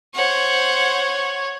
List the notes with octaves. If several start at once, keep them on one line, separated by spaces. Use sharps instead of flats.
C5 C#5 F#5